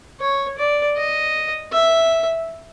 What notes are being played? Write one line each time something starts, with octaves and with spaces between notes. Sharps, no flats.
C#5
D5
D#5
E5